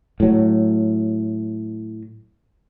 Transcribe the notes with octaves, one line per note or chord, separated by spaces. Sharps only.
A2 F#3